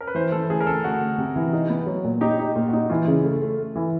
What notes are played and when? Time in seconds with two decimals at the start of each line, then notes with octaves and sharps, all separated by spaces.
0.01 A#4
0.07 B4
0.15 E3 C5
0.32 E3 A4
0.50 D2 G#4
0.60 A#4
0.67 D2 A4
0.84 D2 F#4
1.01 D2
1.18 C3
1.36 E3
1.53 D#4
1.70 B3
1.86 F#3
2.04 A#2
2.21 D#4 G4
2.39 D#4
2.56 A#2 F4
2.68 F#4
2.73 D#4
2.90 E3 F4
3.07 C#3
3.25 A3
3.42 A3
3.58 A3
3.76 E3